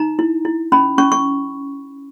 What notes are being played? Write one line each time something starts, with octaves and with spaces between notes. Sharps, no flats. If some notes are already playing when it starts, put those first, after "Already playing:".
Already playing: D#4 A#5
E4
E4
C#4 B5
C#4 C#6
C#6